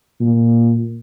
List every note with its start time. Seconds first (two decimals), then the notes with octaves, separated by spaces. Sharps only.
0.20 A#2